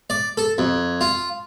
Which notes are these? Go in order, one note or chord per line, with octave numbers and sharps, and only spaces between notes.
D5
A4
F2
F4